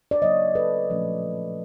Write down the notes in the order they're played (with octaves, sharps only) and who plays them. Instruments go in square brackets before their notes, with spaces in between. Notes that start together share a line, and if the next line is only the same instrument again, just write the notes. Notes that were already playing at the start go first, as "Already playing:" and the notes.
[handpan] D5
C#3 F#3 A#3 C#5 D#5
A4 B4
A#2 F3 A3 C#4